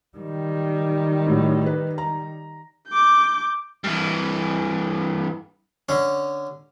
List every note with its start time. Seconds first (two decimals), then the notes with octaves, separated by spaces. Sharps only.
0.17 D#3 G3
1.27 A2 F#3
1.66 B4
1.98 A#5
2.89 D6 G6
3.84 G2 E3
5.89 D3 C#4